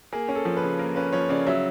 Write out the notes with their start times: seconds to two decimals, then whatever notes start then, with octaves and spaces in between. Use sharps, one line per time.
0.13 A#3 G#4
0.28 C#4
0.35 A4
0.45 F3
0.57 B4
0.63 C#3
0.79 A#3 A#4
0.96 C#4 B4
1.13 F3 C#5
1.29 C#3 D5
1.46 F#3 E5